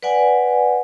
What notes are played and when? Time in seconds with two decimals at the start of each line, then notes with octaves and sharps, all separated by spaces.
0.03 B4 D5 F#5 G#5